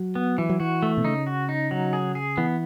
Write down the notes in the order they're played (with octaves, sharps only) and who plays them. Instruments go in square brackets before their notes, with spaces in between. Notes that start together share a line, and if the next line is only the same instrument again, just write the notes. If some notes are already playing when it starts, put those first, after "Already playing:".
Already playing: [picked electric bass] F#3
[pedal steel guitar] B3
E3
[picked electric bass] F#3
[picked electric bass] E3 [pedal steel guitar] F#4
[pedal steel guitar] A3
[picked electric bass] B2
[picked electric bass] C#3 [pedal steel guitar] D#4
[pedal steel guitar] F#4
D#4
F#3
G#4
G#4
[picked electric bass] E3 [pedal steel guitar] B3